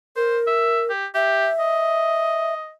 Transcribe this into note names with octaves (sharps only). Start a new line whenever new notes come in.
A#4 C5
E5
G4
G4 E5
D#5